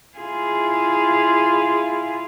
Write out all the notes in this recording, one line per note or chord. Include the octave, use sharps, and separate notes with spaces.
E4 F4 G#4